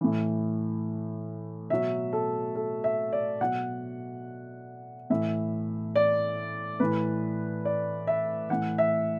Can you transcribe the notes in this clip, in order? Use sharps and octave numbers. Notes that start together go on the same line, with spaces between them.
A2 E3
B2 F#3 E5
A4
A4
E5
D5
B2 F#3 F#5
A2 E3 E5
D5
A2 E3 B4
D5
E5
A2 E3 F#5
E5